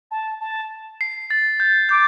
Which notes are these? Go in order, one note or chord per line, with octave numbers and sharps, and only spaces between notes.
A5
A5
C7
A6
G6
D6 G6